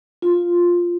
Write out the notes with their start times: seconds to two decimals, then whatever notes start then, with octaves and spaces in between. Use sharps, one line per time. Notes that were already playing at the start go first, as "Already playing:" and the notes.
0.22 F4